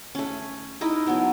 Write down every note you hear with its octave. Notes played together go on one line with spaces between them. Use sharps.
A3 C#4
D#4 E4 A#4 D#5
F#3 A3 B3 A#4